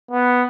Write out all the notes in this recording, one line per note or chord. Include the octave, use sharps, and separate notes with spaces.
B3